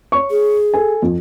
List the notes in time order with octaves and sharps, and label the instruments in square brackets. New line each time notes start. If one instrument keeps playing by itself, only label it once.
[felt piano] C#5 C#6
[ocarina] G#4
[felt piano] A4 G#5
F2